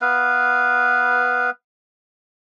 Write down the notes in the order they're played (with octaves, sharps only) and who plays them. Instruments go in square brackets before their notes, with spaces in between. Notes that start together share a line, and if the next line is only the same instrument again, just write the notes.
[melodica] B3 B4 F5